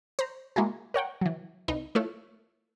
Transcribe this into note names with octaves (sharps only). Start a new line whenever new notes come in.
C5 A#5
G#3 A#3 E4 F#4 G#4
A#4 C#5 F#5 G5
E3 F#3
C2 D#4 B4
A3 E4 F4 A4 C#5